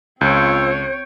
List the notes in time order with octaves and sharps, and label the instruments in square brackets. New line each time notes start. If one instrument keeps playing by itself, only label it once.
[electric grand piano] C#2 [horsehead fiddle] C4 C#5 [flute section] F4 E6 [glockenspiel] G6 D7